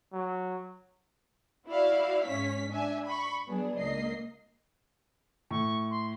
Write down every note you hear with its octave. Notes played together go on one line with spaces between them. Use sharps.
F#3
E4 F#4 D5 E5 F5
G#2 C#4 C#5 B6
D4 E5 G#5
B5 C#6
F#3 B3 D4 G#4
C#2 A#3 D#5 C7
A2 C#6
C6